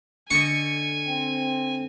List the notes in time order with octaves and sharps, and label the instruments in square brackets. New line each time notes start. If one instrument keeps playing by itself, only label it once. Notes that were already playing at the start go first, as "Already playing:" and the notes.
[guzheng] D3 D#5 [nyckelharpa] G#5 [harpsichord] C#6
[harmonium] C4